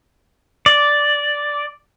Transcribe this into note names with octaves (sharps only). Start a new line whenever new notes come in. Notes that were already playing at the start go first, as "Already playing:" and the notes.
D5